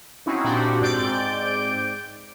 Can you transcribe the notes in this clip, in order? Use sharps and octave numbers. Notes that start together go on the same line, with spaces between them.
C4 C#4 D#4 E4 F#4
A#2 C4 D4 F#4 G4
G#2 C4 D5 G6 D7